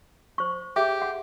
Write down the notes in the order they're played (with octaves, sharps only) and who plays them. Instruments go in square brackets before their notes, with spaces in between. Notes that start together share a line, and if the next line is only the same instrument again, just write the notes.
[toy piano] C5 C#6
[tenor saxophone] G4 [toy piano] G#4 E5
[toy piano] F#5